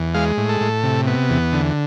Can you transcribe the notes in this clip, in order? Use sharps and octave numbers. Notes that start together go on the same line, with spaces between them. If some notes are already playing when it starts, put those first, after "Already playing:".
Already playing: E2
G#3 F5
A2
A4
A2
C3
B3
E2
D3